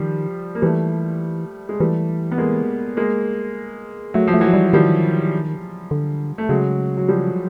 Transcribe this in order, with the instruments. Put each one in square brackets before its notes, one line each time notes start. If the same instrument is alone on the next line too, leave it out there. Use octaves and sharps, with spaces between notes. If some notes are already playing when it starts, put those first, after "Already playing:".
Already playing: [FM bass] D#3 [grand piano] F3 G3
[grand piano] A#3
[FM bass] E3 [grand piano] G3 A3
[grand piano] G#3
[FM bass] E3 [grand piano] G3 A3
[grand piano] B3
G#3 A#3
G#3 A#3
[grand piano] F#3 [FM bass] A3
[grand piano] F3
[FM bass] A3
[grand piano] E3 F#3
[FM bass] G3
[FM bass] D#3 [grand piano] F3 G3
[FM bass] D3
[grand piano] A3
[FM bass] C#3 [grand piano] F#3 G#3
[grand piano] F#3
F3 G3